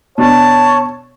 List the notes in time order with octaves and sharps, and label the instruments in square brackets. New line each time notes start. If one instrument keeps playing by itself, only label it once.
[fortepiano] B2 D4 [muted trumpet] C#5 [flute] A5